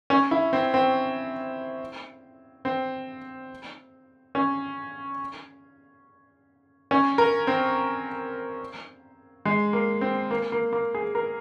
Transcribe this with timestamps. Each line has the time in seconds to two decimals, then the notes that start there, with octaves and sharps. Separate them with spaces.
0.10 C#4
0.31 E4
0.53 C4
0.74 C4
2.65 C4
4.35 C#4
6.91 C#4
7.18 A#4
7.47 C4
9.45 G#3
9.73 A#3
10.01 C4
10.31 A#3
10.52 A#3
10.73 A#3
10.95 G#4
11.15 A#4